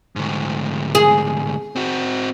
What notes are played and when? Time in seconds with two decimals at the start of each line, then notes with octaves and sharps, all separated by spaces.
0.16 D2 G#2
0.95 G#4
1.76 C4 F#4